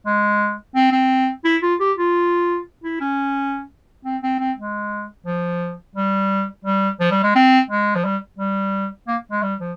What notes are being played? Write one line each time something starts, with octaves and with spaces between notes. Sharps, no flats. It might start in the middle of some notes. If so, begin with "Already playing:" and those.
G#3
C4
C4
E4
F4
G4
F4
E4
C#4
C4
C4
C4
G#3
F3
G3
G3
F3
G3
G#3
C4
G#3
F3
G3
G3
A#3
G#3
G3
F3